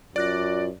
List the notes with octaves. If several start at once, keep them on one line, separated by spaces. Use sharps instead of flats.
F#2 F4 D5 D6 F#6 A#6